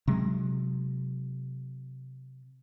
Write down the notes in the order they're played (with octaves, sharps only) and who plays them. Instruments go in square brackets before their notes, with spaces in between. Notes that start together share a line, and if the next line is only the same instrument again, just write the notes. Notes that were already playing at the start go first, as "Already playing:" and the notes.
[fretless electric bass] C3 F#3 G#3